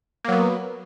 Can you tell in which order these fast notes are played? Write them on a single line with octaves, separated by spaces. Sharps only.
A#3 F#3 B3